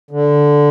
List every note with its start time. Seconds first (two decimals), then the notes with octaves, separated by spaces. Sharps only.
0.11 D3